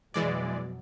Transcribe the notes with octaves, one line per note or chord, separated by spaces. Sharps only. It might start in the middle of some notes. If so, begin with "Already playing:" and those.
F2 B2 E3 F#3 G#3 D5